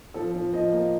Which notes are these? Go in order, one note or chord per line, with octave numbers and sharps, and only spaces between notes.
F3 A4
F3
F3 D#5
A#3